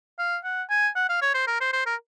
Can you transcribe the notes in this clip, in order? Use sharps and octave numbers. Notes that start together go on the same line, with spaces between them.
F5
F#5
G#5
F#5
F5
C#5
C5
A#4
C5
C5
A#4